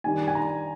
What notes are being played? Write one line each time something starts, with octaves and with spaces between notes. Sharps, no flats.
D#3 G3 D4 G#5
G#5
A#5